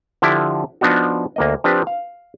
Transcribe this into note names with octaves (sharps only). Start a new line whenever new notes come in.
D3 F3 D4 E4 G4
F3 B3 D4 D#4 F#4
D2 A#3 D#5
F3 C4 D4 G4 B4
F5